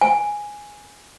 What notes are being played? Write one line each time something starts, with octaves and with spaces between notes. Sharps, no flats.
G#5